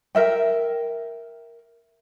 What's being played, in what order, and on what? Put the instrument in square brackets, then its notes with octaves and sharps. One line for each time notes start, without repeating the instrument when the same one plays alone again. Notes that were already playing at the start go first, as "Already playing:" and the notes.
[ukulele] A#4 E5 G5